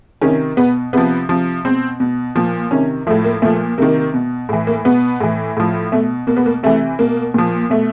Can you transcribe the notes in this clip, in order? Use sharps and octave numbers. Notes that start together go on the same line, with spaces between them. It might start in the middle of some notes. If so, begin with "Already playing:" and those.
C3 D#3 C#4
B2 B3
C3 F3 B3
C3 F3
B2 C4
B2
A#2 F3
C3 D#3 C#4
A2 F3 A3
A#3
A#2 F3 A3
C3 D#3 A#3
B2
A2 E3
A#3
B2 B3
A2 E3
A2 F3
B2 A3
B2 A#3
B3
A#3
C3 E3 A3
B2 A#3
A#2 F3
B2 A3